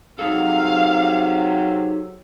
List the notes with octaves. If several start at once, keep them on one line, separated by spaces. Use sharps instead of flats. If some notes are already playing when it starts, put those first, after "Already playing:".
C3 F#3 D#4 G#4 A4 F5